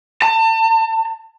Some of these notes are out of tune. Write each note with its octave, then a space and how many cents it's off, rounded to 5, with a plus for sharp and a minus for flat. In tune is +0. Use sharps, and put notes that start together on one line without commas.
A5 +35